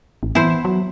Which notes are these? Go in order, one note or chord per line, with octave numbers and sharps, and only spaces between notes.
A1
E3 B3 E4 C5
F#3